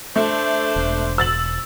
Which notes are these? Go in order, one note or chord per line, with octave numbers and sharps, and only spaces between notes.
A3 D4 C5
E1
E6 A6 F#7